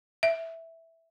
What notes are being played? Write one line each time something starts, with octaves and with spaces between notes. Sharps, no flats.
E5